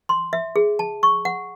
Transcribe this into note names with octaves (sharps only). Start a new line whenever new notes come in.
C6
E5
G#4
A5
C#6
F#5